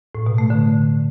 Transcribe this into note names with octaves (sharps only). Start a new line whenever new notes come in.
A2
B2
A3
D3